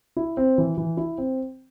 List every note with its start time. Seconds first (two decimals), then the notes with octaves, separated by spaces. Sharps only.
0.16 E4
0.37 C4
0.58 E3
0.77 E3
0.97 E4
1.18 C4